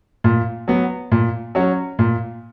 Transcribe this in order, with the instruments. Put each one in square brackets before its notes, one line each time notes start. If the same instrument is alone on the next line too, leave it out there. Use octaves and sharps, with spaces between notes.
[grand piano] A#2
F#3 B3
A#2
F#3 C#4
A#2